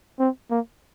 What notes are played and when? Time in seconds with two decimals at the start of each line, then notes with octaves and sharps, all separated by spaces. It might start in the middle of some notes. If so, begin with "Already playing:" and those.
0.20 C4
0.50 A#3